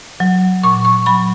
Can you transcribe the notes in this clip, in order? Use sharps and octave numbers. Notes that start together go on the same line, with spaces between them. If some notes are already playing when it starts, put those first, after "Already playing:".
F#3
A#2 C#6
C#6
F#3 B5